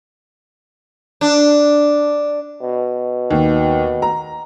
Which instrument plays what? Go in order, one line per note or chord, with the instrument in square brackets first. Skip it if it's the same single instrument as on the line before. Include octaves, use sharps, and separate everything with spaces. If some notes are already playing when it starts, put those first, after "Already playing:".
[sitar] D4
[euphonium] B2
[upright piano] D#2
A#5